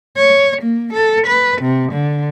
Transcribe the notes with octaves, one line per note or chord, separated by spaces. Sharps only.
C#5
A#3
A4
B4
C3
D3